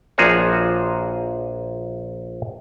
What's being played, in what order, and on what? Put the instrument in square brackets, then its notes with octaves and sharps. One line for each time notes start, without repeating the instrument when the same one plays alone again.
[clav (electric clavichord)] A#1 A#2 F3 F#4 G#4 C#5